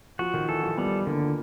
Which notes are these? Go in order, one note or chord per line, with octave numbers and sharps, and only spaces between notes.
F3 F#4
D#3
E3 A4
F3
G3 B3
D3 A#3